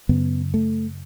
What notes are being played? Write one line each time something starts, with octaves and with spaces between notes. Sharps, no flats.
F#2 C#3 B3
A3